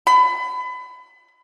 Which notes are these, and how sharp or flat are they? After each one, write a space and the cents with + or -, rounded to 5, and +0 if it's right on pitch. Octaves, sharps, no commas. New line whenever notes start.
B5 +30